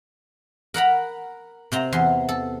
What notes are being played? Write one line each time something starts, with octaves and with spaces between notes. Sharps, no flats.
A#4 F#5 A#5 B5
C3 C4 A#5
E2 C6
A4